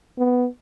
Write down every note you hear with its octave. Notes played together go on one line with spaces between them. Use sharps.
B3